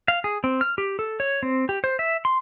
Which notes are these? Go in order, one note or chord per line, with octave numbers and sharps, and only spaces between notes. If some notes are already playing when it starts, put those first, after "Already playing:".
F5
G#4
C4
F6
G4
A4
C#5
C4
G4
C5
E5
C6